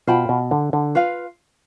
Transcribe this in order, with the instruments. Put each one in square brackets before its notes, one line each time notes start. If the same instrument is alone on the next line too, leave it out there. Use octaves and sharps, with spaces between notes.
[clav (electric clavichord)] B2 [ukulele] F4 C5 G5 B5
[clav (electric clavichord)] B2
D3
D3
[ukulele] F4 B4 F5